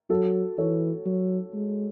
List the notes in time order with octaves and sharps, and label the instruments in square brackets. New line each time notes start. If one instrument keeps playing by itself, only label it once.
[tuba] F#3 [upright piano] F#4 A4
[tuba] E3 [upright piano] A4 C#5
[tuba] F#3
G#3